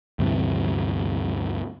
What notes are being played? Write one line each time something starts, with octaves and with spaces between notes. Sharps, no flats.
D2 G2 C3 E3